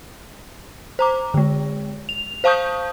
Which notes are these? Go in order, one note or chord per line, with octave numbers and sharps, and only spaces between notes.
C5 A#5 D6
D3 G#3
F7
C5 F5 A5 C#6 D#6 G6